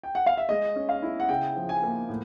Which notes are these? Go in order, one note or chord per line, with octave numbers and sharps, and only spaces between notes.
G5
F#5
F5
E5
G#3 D#5
C#4
F5
E4
F#5
C#3 G5
F3
G#5
A#3
A2